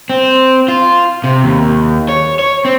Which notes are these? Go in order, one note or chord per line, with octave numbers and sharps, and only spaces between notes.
C4
F4
C3
D#2
C#5
C#5
C4